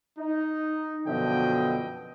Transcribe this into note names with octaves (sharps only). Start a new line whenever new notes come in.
D#4
F#2 B2 D3 F3 D#5 G5